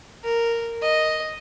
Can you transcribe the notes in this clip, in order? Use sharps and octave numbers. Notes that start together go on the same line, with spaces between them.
A#4
D#5